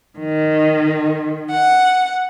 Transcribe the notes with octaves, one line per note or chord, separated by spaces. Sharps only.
D#3
F#5